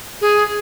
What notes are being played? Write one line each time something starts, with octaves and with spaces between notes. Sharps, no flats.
G#4